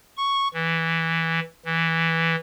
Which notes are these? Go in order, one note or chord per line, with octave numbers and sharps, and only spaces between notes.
C#6
E3
E3